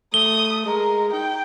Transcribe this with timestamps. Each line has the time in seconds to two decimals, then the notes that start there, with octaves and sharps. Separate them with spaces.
0.14 A3 D#6 G7
0.66 G#3 A#4
1.13 D#4 G5